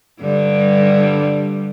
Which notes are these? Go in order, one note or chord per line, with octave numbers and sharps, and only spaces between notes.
G2 D3 G3